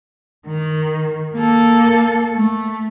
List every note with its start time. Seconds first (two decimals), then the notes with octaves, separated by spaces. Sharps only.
0.47 D#3
1.34 A#3 A4
2.35 A3